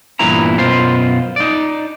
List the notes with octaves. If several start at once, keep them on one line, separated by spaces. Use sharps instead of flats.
E2 G2 A#2 E3 E4 A#5
F#2 B2 F4 C5
D#4 D5